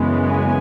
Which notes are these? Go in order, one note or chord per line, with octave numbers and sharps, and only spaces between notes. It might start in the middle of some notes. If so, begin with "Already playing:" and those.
Already playing: F#2 C#3 E3 G#3 B3
G#5